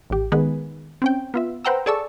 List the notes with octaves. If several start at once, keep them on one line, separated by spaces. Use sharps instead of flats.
A1 G4
D#3 G#3 B3 G#4 B4
C4 C#4 G5
B3 F4 E5
B4 C5 F#5 G5 A#5 E6
G#4 A4 D5 A5 C#6 E6